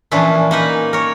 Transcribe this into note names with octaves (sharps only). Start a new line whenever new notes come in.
A#2 E3 F3 C#4 D4 E4
A#3 D#4 B4
A#4 C#5